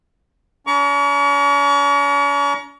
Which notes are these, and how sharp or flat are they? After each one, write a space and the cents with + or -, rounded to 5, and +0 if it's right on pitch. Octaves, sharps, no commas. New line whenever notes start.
C#4 +45 A#5 +20 C#6 +40